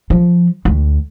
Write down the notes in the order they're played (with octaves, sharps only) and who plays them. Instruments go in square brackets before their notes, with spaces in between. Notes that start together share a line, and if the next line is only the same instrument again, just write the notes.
[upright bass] F3
D2